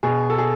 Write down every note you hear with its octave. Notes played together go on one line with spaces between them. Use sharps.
B2 G#4
A4
G#4